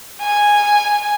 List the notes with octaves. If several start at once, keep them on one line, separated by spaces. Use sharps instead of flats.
G#5